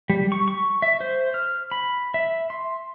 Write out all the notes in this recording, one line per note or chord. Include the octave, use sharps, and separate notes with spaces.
G3
C#6
C#6
E5
C5
F6
B5
E5
C6